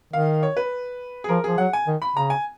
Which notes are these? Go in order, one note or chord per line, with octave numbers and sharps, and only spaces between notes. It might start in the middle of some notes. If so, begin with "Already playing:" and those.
D#3 F5
C#5
B4
G#4
F3 A#4
F3 G#4
F#3 F#5
G#5
D#3
B5
C#3 A#5
G#5